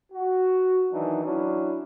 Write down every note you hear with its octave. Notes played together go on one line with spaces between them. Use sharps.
F#4
D#3 E3 F#3 D4 D#4
F#3 C#4 D4 E4